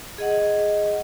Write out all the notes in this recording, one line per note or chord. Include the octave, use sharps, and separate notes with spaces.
G#4 D#5 F#5